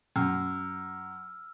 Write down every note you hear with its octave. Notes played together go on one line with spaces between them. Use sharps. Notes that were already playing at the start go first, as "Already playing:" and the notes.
F#2 E6 F6